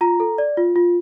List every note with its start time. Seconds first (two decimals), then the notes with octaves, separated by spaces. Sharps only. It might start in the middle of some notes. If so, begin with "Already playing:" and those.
0.01 F4 A#5
0.20 A4
0.38 D5
0.57 F4
0.76 F4